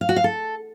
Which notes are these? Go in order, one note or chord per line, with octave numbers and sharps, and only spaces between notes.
F5
F#4
F5
A4